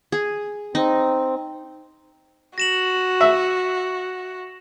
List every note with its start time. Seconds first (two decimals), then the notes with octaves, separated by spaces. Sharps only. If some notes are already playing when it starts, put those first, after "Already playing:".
0.12 G#4
0.75 C4 D#4
2.58 F#4 A#6 E7 F#7
3.21 E5